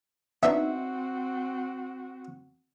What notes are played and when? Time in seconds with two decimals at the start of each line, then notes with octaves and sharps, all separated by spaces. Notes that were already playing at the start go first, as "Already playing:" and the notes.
0.43 B3 C4 D4 D#4 F#4 E5